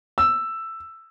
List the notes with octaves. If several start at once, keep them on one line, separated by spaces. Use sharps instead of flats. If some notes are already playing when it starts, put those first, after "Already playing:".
E6